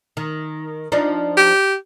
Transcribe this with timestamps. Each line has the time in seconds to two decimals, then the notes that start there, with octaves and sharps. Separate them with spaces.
0.17 D#3
0.92 F3 D4 D#4
1.37 G4